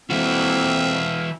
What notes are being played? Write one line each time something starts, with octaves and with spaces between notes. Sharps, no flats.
F2 E3 A#3 C4 F#4 E5 F5